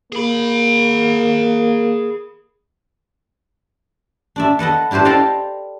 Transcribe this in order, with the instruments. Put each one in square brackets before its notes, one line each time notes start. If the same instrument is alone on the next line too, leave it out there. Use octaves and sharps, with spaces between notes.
[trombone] A#3 [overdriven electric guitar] G#4 B5
[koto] D4 D5 E5
A4 B4 D#5 F#5
D4 E4 G4 B4 C5
A4 D5 D#5 F5 G5 A5